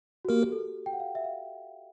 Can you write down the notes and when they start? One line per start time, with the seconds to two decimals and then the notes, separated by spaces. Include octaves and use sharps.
0.25 F#4
0.29 A#3 G4 A#4
0.52 A4
0.86 G5
0.93 F#5
1.00 F5
1.15 E5
1.24 F5